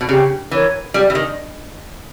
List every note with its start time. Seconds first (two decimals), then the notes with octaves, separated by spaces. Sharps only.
0.01 B2
0.09 C#3 G4
0.51 E3 A#4 C#5
0.94 G3 G4
1.10 E3
1.15 D#3